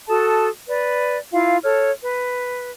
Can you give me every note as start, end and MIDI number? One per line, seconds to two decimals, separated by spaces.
0.08 0.48 66
0.08 0.48 69
0.08 0.48 81
0.08 0.48 87
0.68 1.18 71
0.68 1.18 74
1.33 1.58 64
1.33 1.58 65
1.33 1.58 77
1.64 1.91 69
1.64 1.91 73
1.64 1.91 89
2.03 2.72 71